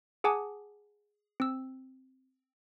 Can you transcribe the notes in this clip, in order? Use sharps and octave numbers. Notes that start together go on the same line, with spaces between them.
G#4 F#5 G#5 A5 D6 D#6
C4 E6